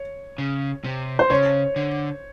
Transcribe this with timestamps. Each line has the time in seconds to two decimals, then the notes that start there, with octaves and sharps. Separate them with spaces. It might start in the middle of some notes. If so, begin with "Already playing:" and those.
Already playing: C#5
0.38 C#3
0.84 C3
1.19 C5
1.30 C#3 C#5
1.76 D3